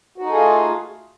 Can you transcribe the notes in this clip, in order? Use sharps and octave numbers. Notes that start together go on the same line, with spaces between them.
A3 D#4 F4 F#4 G#4